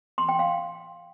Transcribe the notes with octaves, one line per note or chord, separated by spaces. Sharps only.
C6
G5
F5